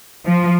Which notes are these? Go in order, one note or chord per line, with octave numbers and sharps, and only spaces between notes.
F3